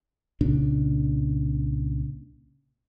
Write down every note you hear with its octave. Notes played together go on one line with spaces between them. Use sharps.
C2 A#2 C#3 D4